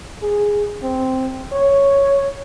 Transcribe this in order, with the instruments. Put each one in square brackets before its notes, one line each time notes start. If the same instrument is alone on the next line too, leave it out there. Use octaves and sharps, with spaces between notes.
[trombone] G#4
C4
C#5